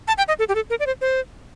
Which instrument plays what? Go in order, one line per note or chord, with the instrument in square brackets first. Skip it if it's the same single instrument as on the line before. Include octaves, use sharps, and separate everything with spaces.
[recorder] A5
G5
D#5
A4
G4
A4
A#4
D5
C5
C5